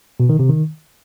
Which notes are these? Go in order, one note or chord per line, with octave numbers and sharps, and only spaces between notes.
B2
D#3
C3
D#3